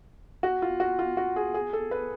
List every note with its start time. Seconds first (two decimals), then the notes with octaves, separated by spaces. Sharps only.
0.43 F#4
0.62 F4
0.80 F#4
0.99 F4
1.17 F#4
1.36 G#4
1.54 G#4
1.73 A4
1.91 B4